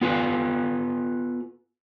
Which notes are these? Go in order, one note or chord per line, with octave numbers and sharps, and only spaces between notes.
B3 F4 A4 B4 F5